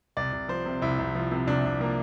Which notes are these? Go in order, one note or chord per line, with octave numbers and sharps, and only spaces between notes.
C2 D5
C2
F3 C5
C3
C2 E4
C2
F3
C3
C2 D4
C2
F3 A#3